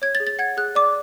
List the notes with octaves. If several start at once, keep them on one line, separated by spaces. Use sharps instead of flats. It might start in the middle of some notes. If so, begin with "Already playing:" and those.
C#5 G#6
A6
G#4
A6
F#5 G#6
G#4 F#6
D5 D6